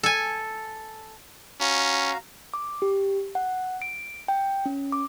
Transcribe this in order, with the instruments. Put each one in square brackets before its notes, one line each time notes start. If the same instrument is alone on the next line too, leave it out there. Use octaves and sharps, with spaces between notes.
[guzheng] A4 G#5
[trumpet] C#4 [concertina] F#4 F5 A#5
[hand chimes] D6
G4
F#5
D7
G5
C#4
D6